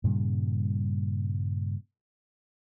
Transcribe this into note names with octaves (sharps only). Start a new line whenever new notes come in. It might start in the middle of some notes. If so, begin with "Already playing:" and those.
G2 A#2 C#3 G3